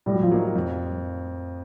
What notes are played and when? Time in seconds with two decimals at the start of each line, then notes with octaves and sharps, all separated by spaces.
0.06 A2 G3
0.14 F#3
0.22 F3 G3
0.31 F#3 A#3 D#4
0.56 F2